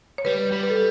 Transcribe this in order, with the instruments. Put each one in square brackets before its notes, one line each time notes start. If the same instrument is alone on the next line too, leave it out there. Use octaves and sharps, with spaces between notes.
[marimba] C#5
[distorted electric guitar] G3 [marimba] B4
[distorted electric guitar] G3
[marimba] B4
A4